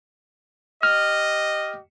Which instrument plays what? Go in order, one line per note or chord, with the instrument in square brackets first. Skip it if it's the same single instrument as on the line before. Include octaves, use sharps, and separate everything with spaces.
[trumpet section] G4 D#5 [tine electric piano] F6